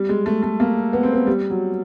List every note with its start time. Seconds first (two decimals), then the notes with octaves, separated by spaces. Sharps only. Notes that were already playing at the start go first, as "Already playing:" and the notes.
Already playing: G3
0.09 G#3
0.26 A3
0.43 A3
0.60 A#3
0.93 B3
1.03 C4
1.13 B3
1.27 G3
1.50 F#3